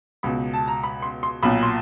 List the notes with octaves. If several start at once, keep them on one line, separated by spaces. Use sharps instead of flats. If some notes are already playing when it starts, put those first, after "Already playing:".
C#2 B2 B5
A5
A#5
B5
C6
C6
B1 A#2 B5
C6